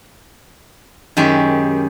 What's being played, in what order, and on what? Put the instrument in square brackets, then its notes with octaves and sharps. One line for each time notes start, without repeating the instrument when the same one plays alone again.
[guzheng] F#2 D#3 G#3 G4